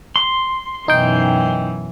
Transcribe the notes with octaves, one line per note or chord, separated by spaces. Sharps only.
C6
F#2 B2 E3 D#4 G5